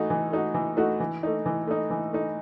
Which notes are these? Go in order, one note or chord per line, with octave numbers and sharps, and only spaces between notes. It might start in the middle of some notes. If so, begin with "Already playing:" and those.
Already playing: E3 A3 D#4 F#4
E3
A3 D#4 F#4
E3
A3 D#4 F#4
E3
A3 D#4
E3
A3 D#4
E3
A3 D#4